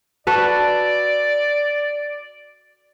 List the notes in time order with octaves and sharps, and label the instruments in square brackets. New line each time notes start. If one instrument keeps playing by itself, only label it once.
[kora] F#4 A4 B4 [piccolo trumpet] D5